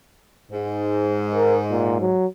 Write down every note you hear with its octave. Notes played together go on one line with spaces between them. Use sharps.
G#2
A#4
A#2
F#3